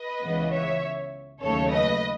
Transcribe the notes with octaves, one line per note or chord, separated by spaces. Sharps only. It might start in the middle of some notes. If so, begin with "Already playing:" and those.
Already playing: B4 D#5
C#2 C#3 E3 B3
C#5 E5
D#2 C#3 F#3 A3 A4 C#5
B4 D#5